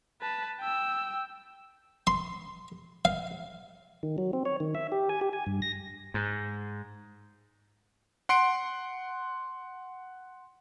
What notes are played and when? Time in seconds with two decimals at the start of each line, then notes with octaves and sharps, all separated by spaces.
0.22 B4 A5
0.60 G5 E6
2.07 C6
3.05 F5
4.03 D#3
4.18 F#3
4.33 C4
4.45 C#5
4.60 D#3
4.75 E5
4.92 G4
5.09 G#5
5.21 G4
5.33 G#5
5.46 G2
5.62 A#6
6.14 G#2
8.29 F#5 C6 C7 D7